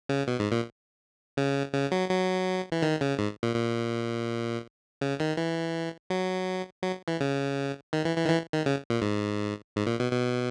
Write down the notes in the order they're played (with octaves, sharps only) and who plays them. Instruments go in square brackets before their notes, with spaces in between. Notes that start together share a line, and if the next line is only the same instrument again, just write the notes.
[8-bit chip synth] C#3
B2
G#2
A#2
C#3
C#3
F#3
F#3
E3
D#3
C#3
G#2
A#2
A#2
C#3
D#3
E3
F#3
F#3
E3
C#3
D#3
E3
E3
D#3
E3
D#3
C#3
A#2
G#2
G#2
A#2
B2
B2